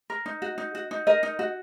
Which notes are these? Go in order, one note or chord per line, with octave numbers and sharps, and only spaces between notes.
A#4
D#4
F#4
D#4
F#4
D#4
A#4 D#5
D#4
F#4